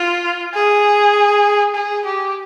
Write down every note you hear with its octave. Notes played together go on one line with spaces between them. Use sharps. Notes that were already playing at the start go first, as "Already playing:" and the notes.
Already playing: F4
G#4
G#4
G4